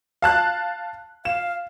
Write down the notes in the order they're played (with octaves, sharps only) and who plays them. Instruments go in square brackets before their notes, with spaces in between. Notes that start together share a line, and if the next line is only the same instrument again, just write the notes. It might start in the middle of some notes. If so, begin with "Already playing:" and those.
[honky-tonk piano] F5 A5 F#6
[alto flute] F5 [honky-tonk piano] E7